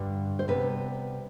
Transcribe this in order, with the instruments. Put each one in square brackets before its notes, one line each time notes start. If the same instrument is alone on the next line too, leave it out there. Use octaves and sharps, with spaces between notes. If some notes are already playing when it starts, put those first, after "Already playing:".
Already playing: [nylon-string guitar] G2 D3 G3
C5
C3 G3 B3 B4